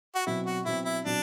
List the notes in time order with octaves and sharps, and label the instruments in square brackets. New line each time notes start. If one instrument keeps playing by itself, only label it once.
[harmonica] F#4
[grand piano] B2 F#3 C4 [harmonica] E4
[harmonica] F#4
[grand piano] B2 F#3 C4 [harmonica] E4
[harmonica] E4
[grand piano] B2 F#3 C4 [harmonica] D4